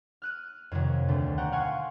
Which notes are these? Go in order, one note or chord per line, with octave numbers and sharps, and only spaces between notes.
F6 F#6 D#7
F2 C3 D#3 F#3
D2 B2 A3
F#5 G5 A#5 C#6
F5 F#5 G#5 C6 C#6